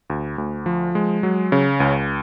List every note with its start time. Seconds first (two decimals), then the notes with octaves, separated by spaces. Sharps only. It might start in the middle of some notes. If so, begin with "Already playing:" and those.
0.10 D2
0.38 D2
0.66 F3
0.95 G#3
1.23 F#3
1.52 C#3
1.80 C#2